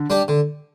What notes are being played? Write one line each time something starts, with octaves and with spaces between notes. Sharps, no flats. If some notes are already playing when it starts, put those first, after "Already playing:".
Already playing: D3
G3 D4 G4
D3